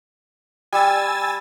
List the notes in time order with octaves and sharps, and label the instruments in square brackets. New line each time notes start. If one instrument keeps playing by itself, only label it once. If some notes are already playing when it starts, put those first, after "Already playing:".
[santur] G3 [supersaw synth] G#5 E6 A6